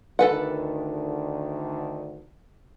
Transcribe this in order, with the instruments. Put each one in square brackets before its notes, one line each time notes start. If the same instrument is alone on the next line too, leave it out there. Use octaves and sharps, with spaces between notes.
[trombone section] D2 D3 D#3 [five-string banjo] A4 B4 F#5